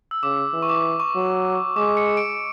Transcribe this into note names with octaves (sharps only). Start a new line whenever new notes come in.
E6
C#3 D6
E3
C#6
D6
C#6
F#3
G#3 D6
C#7
D7